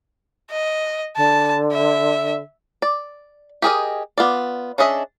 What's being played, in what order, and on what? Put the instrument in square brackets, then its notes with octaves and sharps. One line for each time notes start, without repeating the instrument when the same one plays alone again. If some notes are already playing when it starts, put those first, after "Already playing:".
[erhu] D#5
[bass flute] D3 [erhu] A5
[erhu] E5
[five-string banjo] D5
G4 G#4 A#4 D#5
B3 F4 D5
C#4 D4 G#4 D#5 E5